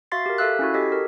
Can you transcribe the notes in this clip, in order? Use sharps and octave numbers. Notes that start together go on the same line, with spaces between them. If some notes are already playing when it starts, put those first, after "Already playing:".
F#4 E5 F5 C6 A6 C7
G4 A#4
A4 E5 F5 E6 F#6
C#4 E4 F#4
G4 A4 D#5 G#6 B6
G4 A#4